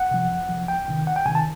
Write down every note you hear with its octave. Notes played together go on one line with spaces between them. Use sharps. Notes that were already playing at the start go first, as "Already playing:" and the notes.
Already playing: F#5
C3 F3
F2
C3 F3
C#2 G5
C3 D#3
C#2 F#5
G5
C3 D#3 G#5
A5